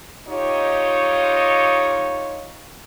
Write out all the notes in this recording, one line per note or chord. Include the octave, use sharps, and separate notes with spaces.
D#4 F4 G4 C#5 D#5